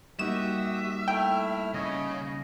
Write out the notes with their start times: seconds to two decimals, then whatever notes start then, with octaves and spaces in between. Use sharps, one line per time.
0.19 G3 A#3 D#4 F#4 G4 E5 D#6 E7
1.08 A3 E4 G5 F6
1.74 C#3 C#5 D#5